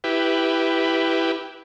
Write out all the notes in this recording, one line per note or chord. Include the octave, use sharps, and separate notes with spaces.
E4 G4 B4